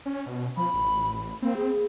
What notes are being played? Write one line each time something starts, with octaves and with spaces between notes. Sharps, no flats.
C#4
B2
F3 B5
A1
A#3 C4
G#4